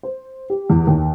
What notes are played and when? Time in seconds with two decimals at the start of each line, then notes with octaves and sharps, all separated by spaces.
0.03 C5
0.50 G4
0.70 E2
0.87 D#2